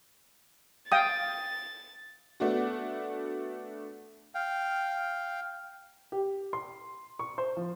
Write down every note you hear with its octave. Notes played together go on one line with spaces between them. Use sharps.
F5 G5 D#6 A6
A3 B3 D4 F#4
F5 G5
G4
C6
C#6
C5
F3